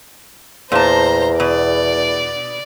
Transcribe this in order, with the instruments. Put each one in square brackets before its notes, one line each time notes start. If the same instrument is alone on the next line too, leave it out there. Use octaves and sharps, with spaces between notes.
[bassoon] E2 [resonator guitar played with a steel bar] A#2 A5 [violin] C5 A#5
[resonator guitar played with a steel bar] B2 [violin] D5